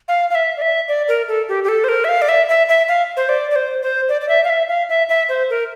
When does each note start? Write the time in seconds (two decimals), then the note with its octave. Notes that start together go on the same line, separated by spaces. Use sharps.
0.08 F5
0.30 F5
0.35 E5
0.57 D5
0.62 E5
0.88 D5
1.08 A#4
1.28 A4
1.49 G4
1.64 G4
1.68 A4
1.84 C5
1.89 A#4
2.04 E5
2.09 F5
2.22 D5
2.29 E5
2.49 E5
2.69 E5
2.88 F5
3.17 C5
3.29 D5
3.51 D5
3.56 C5
3.82 C5
4.09 D5
4.21 D5
4.29 E5
4.44 F5
4.49 E5
4.69 F5
4.89 E5
5.09 E5
5.29 C5
5.50 A#4